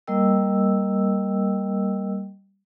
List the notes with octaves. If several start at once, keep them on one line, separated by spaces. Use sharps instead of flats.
G3 A#3 A#4 D#5 G5 E6